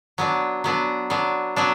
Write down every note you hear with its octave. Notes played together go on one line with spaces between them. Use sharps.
F#3 B3 D4
F#3 B3 D4
F#3 B3 D4
F#3 B3 D4